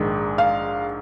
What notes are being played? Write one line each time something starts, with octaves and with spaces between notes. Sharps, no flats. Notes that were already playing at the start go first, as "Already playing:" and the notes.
Already playing: A#1 G#2 D#3 G#3
F5